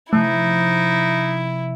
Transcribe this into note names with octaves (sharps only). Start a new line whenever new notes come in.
C3 F3 A3 D#4 E4